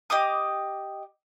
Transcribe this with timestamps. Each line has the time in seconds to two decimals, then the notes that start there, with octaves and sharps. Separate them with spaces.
0.10 G4 D#5 D6 D#6